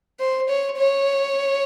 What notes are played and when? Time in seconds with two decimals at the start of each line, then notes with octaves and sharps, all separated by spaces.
0.20 C5
0.49 C#5
0.78 C#5